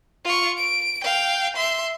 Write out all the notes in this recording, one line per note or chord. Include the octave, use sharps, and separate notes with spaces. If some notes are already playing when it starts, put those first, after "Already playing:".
F4 C#6
D7
F5 G5
E5 C6